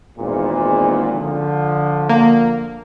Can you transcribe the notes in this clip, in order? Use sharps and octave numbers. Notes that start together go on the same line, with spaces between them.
G#1 E2 A#2
D3 F3
A#3